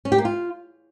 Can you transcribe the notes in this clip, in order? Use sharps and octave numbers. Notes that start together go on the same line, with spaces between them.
C#4
G4
A#3
F4